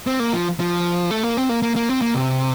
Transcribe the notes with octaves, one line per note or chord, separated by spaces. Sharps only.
C4
A#3
F3
F3
A3
A#3
C4
A#3
A#3
A#3
C4
A#3
C3